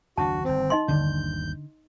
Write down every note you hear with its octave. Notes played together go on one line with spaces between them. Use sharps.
F#1 D#2 D4 F#4 A5
G1 D#3 C4
D#4 D#5 C6
G1 D#2 D3 D4 G6